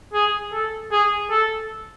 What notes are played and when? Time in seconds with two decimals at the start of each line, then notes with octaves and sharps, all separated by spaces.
0.13 G#4
0.52 A4
0.91 G#4
1.30 A4